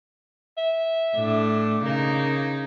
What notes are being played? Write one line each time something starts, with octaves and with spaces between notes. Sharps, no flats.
E5
A2 D4
C#3 A#3 D#4